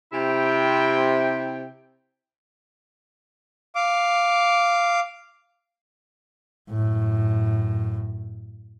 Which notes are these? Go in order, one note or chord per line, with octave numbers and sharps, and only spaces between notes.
C3 E4 G5
F5 D6
F#2 A2